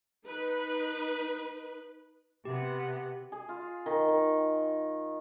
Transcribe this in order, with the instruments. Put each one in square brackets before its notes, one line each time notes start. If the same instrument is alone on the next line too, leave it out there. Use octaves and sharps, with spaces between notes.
[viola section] D#4 B4
[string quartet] C3 B3 [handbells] G4
[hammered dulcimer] G#4
F4
D#3
D#3